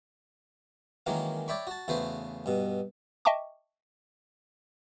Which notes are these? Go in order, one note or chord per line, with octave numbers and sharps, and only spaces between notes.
D#3 E3 F#3 G#3 A#3 C#4
C#5 D5 E5 G5 B5 C#6
F#4 A5
E2 C#3 A3 F#4 B4 C5
G2 B2
D#5 E5 G5 A5 C#6 D6